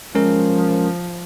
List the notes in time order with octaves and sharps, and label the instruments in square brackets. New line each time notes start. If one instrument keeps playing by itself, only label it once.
[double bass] F3 [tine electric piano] G#3 C#4 A#4